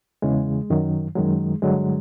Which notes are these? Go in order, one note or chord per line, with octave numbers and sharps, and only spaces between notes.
E2 C#3 E3 G#3
F#2 D#3 F#3
F#2 D#3 F#3 G#3
G2 D3 F#3 G#3